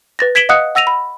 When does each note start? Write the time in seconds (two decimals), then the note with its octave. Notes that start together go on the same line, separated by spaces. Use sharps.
0.19 B4 A6 A#6
0.35 G#6 B6 D7 E7 F#7 G7
0.49 D#5 F5 F#5 D#6 F#6 C#7
0.75 F#5 E6 A#6 D#7 F7
0.87 B5